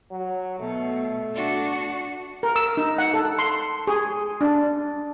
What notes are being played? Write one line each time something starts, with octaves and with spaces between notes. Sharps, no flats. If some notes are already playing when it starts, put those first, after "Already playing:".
F#3
B2 A3
D4 F#4
A#4
E6
D#4
F#5
A4
C6
G#4
D4